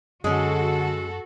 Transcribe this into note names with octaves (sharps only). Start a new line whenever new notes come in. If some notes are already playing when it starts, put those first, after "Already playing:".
F#2 D3 G#3 C#4 F#4 A4